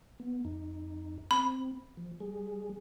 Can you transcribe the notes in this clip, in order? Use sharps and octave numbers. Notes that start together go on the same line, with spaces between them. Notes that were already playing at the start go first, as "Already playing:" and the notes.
B3
F2 D#4
C4 B5
F3
G3 G#4